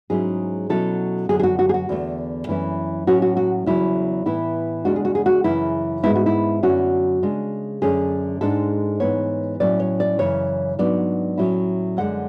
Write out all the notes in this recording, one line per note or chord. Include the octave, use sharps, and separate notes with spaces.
G#2 F#3 C#4 E4 G#4
B2 F#3 C#4 E4 A4
F#2 D3 F#3 G#4
G#4
F#4
F#4
G#4
F#4
E2 D3 A3
F#2 E3 A3 C#4 E4
A2 F#3 C#4 F#4
F#4
F#4
E2 C#3 F#3 E4
A2 E3 B3 E4
E2 C#3 G#3 D4 F#4
G#4
F#4
G#4
F#4
F#2 C#3 E3 E4
G#2 G#3 B3 E4
F#4
E4
F#2 D3 F#3 A3 C#4 F#4
C#3 G#3 D4
F#2 D3 A3 C#4 G#4
G#2 G#3 D4 A4
G#2 E3 B3 C#5
A2 F#3 C#4 E4 D5
C#5
D5
F#2 C#3 E3 C#5
G#2 F#3 B3 D4 D5
A2 F#3 A3 C#4 E4
F#2 D3 G#3 F#5